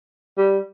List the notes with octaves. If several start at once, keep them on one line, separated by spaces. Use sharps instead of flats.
G3